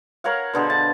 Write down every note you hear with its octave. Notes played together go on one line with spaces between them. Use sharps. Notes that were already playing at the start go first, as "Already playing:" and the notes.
A#4 C#5 F5 F#5
B2 D3 G#4 C5
A5